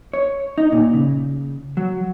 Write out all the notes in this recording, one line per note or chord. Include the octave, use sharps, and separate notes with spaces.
C#5
D#4
A#2
C#3
F#3